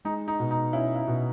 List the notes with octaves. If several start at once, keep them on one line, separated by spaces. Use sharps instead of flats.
G#3 D#4
D#4
B2
D#4
C#4 E4
E4
B2